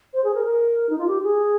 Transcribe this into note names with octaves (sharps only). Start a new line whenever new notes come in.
C5
G#4
A#4
A#4
D#4
F4
G4
G#4